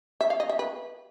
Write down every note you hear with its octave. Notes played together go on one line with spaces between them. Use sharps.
E5
F5
D#5
E5
B4